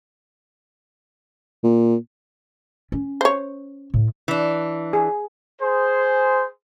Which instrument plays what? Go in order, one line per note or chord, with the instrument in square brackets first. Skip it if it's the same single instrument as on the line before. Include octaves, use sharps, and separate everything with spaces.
[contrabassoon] A#2
[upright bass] C#4
[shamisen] C5 C#5
[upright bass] A2
[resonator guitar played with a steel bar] E3 D4
[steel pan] G#4
[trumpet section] G#4 C5